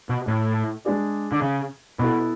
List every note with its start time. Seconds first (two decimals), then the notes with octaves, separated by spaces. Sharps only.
0.09 B2
0.27 A2
0.85 G#3 D4 G#4 D5
1.32 D3
1.42 C#3
1.99 B2 B3 E4 A4